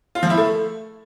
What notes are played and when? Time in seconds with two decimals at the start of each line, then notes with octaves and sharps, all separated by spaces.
0.15 F4
0.23 F3
0.30 E4
0.38 A3